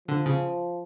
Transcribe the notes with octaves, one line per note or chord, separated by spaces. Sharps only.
D3 F3
C#3